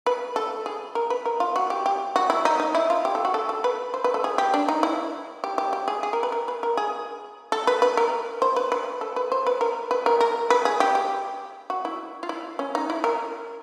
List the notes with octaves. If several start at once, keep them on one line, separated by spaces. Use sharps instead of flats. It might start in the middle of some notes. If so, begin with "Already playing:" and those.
B4
A4
G#4
A#4
B4
A#4
F4
F#4
G4
G4
F#4
E4
D#4
D#4
E4
F4
G4
A4
F#4
A4
A4
B4
C5
B4
A4
G#4
G4
D4
D#4
E4
G4
G4
G4
G#4
G#4
A#4
B4
A#4
B4
A#4
G#4
A4
B4
B4
A#4
C5
B4
B4
A4
B4
C5
B4
A#4
B4
A#4
A#4
B4
G#4
G4
G4
F#4
E4
F4
E4
C#4
D#4
E4
A#4